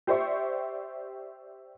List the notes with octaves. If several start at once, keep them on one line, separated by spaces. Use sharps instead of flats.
G4 C5 D5 E5 C#6